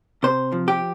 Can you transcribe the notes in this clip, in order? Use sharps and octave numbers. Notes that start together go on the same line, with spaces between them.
C3 C5
F3
G4